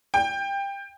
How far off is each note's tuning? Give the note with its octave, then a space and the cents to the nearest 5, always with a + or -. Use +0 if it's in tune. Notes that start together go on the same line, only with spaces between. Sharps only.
G5 +20